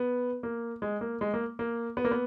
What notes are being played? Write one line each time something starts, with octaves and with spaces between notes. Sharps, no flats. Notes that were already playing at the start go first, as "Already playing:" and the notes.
Already playing: B3
A#3
G#3
A#3
G#3
A#3
A#3
B3
A#3
B3